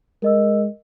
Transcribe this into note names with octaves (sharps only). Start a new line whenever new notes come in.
G#3 A#4 D#5 E6